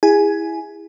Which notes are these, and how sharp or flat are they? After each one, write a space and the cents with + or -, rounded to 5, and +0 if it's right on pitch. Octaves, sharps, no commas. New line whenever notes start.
E4 +0 G#4 -30 G#5 +10